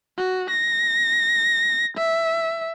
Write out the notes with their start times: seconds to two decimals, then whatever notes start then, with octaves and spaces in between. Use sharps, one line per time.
0.17 F#4
0.50 A#6
1.97 E5